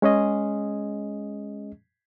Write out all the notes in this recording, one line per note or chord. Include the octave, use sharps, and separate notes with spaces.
G#3 C#4 G#4 D#5